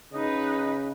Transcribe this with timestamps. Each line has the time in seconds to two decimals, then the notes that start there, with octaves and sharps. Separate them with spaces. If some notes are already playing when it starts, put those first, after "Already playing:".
0.13 C#3 D#4 B4 D#5